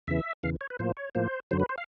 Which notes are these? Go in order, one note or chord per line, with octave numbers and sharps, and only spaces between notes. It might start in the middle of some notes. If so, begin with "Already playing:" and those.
E2 C#3 E3 E5
E2 C#3 E3 F5
C#5
B4
A2 F3 A#3 C5
C#5
A2 F3 A#3 C5
F#2 D3 F#3 C5
B4
C5
F5